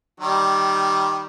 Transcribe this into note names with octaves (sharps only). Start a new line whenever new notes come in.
D#3 G3